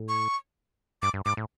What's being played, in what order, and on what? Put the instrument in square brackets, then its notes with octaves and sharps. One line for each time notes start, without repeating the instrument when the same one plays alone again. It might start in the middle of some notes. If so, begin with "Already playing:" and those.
Already playing: [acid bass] A2
[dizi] C#6
[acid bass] G2 [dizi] D6
[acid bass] G2
[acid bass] G#2 [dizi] D6
[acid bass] A2